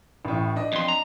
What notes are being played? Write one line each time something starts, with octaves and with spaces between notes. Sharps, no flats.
A1 A2
D4 D#5
F2 C6
A#5